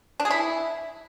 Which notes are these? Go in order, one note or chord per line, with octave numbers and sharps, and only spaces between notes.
D4
G#4
E4